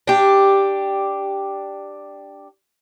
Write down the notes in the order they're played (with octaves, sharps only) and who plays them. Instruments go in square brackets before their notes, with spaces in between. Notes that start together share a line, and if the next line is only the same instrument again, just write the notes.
[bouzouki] D4 G4